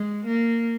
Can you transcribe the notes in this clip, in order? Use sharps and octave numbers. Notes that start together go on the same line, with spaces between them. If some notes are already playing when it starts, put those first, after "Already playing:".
Already playing: G#3
A#3